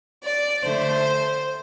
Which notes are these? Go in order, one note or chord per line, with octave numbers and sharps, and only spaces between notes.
D5
D3 A3 C5